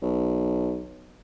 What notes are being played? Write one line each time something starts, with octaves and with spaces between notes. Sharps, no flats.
B1